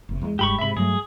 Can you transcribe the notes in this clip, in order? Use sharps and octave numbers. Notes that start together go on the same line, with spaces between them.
F#1 C3
E2 G#3
F1 G2 G#3 G4 B5 C#6
G#2 C3 E5 B5
G2 F#3 A3 G#4